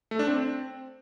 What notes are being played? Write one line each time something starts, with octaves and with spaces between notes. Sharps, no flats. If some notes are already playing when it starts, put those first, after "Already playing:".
A3
D4
C4